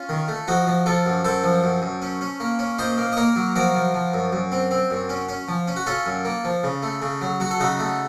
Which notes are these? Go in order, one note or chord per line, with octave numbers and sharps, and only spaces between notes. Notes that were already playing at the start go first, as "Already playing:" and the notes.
Already playing: C#4 F4
D#3
A3
F3 D#4 F#4
F3
F3 F4 A4
F#2
F#2 A4 C5
F3
F#2
F#2
C#4
C#4
A#3
C#4
A#2 C5 D#5
A#3
D#5
A#3 A#4 C#5
F#3
F3 F#4 A#4
F3
F3
F#2
F#2
C4
C4
F#2
C#4
C#4
F3
C#4
F#4
C#4 F4 A4
F#2
A#3
F3
C#3
A3
C#3
F#3
F#3 F#4
A4
C#3 D#4 F#4
A3